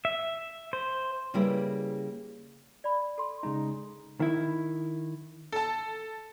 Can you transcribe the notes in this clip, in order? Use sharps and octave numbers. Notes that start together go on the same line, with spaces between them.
E5
C5
C#3 G3 A#3 E4 G#4 B4
D5 B5
A4 C6
C#3 G#3 D#4
D#3 E4
A4 A5